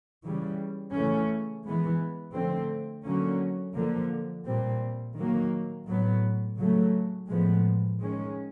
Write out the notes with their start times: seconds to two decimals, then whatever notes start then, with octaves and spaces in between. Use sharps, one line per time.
0.24 C#3 E3 G3
0.94 C#3 E3 A3 C#4
1.64 E3 G#3 B3
2.35 D3 F3 A3 C4
3.06 D3 F#3 A#3 C#4
3.76 D3 F3 A#3
4.47 A#2 G3 C4
5.17 D#3 F#3 A#3
5.88 A2 F#3 B3
6.58 C#3 F#3 A3
7.28 A2 F3 G#3 B3
8.00 D#3 G#3 C#4